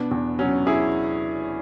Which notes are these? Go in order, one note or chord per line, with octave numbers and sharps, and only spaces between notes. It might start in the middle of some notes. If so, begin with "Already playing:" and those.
Already playing: B2 B3 D4
E2
F#3 C#4
E4 G#4